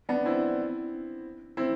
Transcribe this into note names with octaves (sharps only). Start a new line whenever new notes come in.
B3 D4
C4 E4
C4 E4